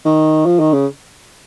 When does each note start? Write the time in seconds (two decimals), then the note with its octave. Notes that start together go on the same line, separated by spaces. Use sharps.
0.05 D#3
0.46 F3
0.59 D#3
0.73 C#3